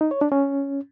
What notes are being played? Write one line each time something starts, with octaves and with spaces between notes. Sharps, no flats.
D#4
C#5
D4
C#4